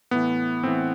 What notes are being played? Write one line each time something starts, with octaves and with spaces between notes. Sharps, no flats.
A2 E3 B3
A2 E3 C4